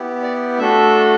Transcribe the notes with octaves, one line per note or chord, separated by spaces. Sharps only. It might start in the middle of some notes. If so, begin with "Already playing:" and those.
Already playing: B3 E4 G4
D5
A3 D4 F#4 A4 E5